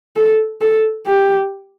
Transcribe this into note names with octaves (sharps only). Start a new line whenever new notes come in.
A4
A4
G4